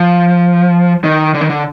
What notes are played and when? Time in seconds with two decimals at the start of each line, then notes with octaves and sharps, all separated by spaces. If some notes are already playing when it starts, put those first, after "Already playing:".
Already playing: F3
1.04 D#3
1.34 D3
1.41 D#3
1.50 D3